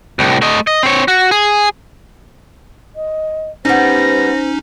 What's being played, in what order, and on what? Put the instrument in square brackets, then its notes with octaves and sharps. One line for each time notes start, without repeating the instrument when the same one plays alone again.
[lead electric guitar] C2 A2
A3 D#5
D#5
C4 C#5
F#4
G#4
[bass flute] D#5
[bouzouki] G3 B3 [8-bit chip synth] C#4 D#4 [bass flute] C5 [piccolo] A#6